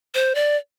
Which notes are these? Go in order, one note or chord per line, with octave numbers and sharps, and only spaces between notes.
C5
D5